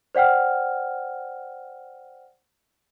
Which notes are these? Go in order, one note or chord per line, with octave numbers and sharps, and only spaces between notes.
C5 D5 F#5 G5 F6